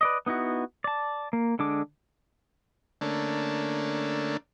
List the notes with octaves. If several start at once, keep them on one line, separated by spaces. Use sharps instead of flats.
B4 D5 D#5
B3 D#4 E4 F#4
D5 A5
A#3
D3 G#3 D4 D6
D3 A3 A#3 C#4 D4